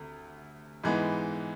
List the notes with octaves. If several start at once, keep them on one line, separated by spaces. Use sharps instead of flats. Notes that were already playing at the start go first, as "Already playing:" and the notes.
Already playing: D2 C3
G#2 E3 G#3 B3